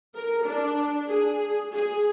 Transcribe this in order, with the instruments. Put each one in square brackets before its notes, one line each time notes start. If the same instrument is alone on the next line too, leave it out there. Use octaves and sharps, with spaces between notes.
[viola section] A#4
D4
G#4
G#4